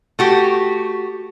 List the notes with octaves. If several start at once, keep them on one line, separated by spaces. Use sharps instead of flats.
A3 F#4 G4